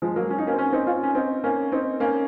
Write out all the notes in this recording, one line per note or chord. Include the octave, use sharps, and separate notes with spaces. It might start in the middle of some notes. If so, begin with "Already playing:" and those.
F3 G#3
F#3 A#3
C#4
D#4
A#3 C#4
C4
A#3 C#4
C4 D#4
C#4 F4
C#4
C4 D#4
A#3 C#4
C4 D#4
A#3 C#4